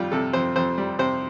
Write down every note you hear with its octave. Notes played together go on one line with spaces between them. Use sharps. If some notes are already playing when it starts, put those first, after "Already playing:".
Already playing: F2 G3 F4
C3 A4
F2 C5
F2 C5
G3
C3 C5